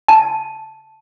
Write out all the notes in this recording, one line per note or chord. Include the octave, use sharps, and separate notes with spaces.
A5